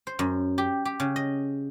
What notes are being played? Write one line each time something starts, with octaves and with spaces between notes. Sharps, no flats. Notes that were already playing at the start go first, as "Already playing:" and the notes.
C5
F#2
G4
G4
C#3
D#5